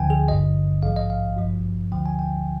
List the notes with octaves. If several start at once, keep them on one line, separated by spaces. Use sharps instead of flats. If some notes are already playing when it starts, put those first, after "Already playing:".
Already playing: D2 D3 F3 G5 G#5
G#4
G#1 G2 D3 D#5
A#1 G#2 F3 F5
D#5
F5
G#1 G2 F3
D2 D3 F3 G5
G#5
G5